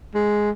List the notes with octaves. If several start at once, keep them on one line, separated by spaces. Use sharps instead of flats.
G#3